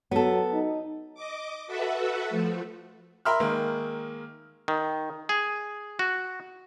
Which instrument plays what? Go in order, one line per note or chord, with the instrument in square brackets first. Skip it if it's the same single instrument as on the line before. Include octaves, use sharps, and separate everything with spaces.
[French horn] F#3 [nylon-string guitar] B3 A4
[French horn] D#4
[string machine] D#5 D6
F#4 A4 B4 E5 F#5
F3 A3
[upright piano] A#4 E5 B5 C6 E6 F6
D#3 G#3 A#3
[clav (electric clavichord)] D#3
G#4
F#4